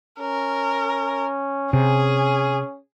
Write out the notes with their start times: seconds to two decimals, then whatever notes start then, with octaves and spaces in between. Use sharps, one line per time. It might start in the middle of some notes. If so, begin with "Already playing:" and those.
0.20 C#4 A#4
1.73 C3 C#4 G#4